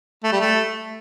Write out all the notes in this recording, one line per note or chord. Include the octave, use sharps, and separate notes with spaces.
A3
G3
A3